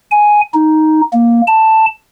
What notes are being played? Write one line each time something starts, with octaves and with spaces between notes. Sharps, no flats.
G#5
D#4
A#3
A5